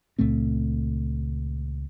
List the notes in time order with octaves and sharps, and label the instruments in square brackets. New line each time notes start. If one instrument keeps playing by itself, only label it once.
[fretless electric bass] C#2 A#2 A3 C4